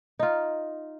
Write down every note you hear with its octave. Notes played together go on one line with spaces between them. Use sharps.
D#4 F4